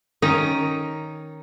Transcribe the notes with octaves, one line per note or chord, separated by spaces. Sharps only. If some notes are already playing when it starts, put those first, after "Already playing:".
D#3 C#4 D#4 A#5